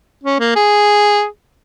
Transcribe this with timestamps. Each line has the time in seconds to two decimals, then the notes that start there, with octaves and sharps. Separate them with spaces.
0.23 C#4
0.39 A#3
0.56 G#4